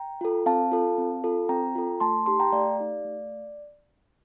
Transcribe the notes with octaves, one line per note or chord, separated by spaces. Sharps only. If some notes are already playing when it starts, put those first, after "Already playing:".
Already playing: G5 A#5
F4 A4
C4 F5 A5
F4 A4
C4
F4 A4
C4 G5 A#5
F4 A4
A3 A5 C6
D#4 G4 A5 C6
G5 A#5
A3 D5 F5
D#4 G4
A3